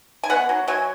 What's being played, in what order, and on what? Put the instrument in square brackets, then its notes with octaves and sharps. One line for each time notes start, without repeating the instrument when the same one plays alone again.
[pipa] G#5
B3 F#5
F#3
F#3 G#5